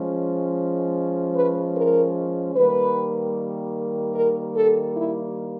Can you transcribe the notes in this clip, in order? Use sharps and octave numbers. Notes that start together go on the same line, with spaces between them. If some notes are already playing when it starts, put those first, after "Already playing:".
Already playing: F3 G#3 C#4
B4
A#4
D#3 G3 A#3 B4
A#4
A4
E4